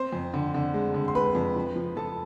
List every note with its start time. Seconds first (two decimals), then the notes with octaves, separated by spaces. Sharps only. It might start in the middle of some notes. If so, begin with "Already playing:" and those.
Already playing: C4 C5 C6
0.13 F2
0.34 D3
0.54 D3
0.74 G#3
0.94 D3
1.08 C6
1.15 G#3 B4 B5
1.35 F2
1.56 F3
1.76 F3
1.96 F3 A4 A5